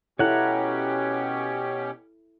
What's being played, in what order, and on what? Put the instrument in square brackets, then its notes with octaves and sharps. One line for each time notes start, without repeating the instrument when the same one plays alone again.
[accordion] B2 C#4 G4 [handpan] E4 A4 [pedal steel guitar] C#5 F#5 A#5